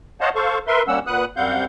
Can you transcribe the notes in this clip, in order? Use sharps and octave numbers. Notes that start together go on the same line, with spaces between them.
C5 C#5 D#5 F5 F#5 A5
A4 C5 F5 C#6
A#4 B4 E5 C6
G3 A#3 C#4 F#5 E6
A#2 B4 F#5 D#6 F#6
F#2 G3 C4 F5 F#5 G6